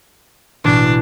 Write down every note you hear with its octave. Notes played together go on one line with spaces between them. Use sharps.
A1 B2 D4